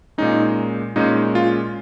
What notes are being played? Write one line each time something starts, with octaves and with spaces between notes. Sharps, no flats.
A#2 G#3 C#4 D#4
A#2 G#3 C#4 D#4
F4